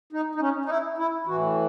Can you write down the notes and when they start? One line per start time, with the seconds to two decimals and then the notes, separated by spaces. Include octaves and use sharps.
0.13 D#4
0.35 D#4
0.41 C#4
0.65 D#4
0.69 E4
0.98 E4
1.27 E3 F#4
1.31 A2